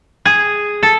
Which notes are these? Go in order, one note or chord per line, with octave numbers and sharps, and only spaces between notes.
G#4
A4